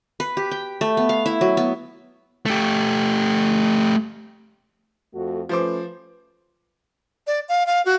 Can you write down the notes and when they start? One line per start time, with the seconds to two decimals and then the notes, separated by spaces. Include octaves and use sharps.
0.20 B4
0.37 G4
0.51 G5
0.81 A3
0.97 B3
1.09 F5
1.26 E4
1.41 F#3
1.57 B3
2.46 A3 G4
5.14 F2 A3 F#4
5.49 F3 A3 C#4 B4 C5 D6
7.27 D5
7.49 F5
7.66 F5
7.86 F#4